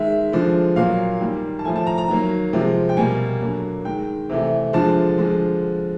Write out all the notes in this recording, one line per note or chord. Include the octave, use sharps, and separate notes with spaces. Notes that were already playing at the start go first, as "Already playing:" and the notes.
Already playing: D#3 G#3 E5
D3 F3 G#3
A#2 F#3 A#3 F5
D#3 G3 A#3
A5
A2 F3 A3 G#5
A5
A#5
A#5
D#3 F#3 A#3
C3 F3 G#3
G5
B2 G3 A#3 G#5
D3 F#3 A#3
D#3 G#3 G5
C3 E3 A3
D3 F3 G#3 A5
D3 F3 G#3